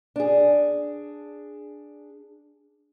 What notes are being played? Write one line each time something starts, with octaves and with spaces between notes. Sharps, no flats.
D4 G#4